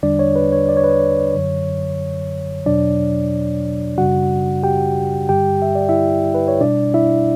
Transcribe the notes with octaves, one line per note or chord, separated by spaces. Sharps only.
E2 D3 G3 D4 D5
C#5
B4
C#5
D5
C#5
B4
C#5
F#2 D3 F#3
E2 B2 F#3 D4 D5
F#2 C#3 G3 F#4 F#5
G4 G5
G2 D3 G3 G4 G5
E5
D5
E4 E5
B4
C#5
B2 G3 D4 D5
E4 E5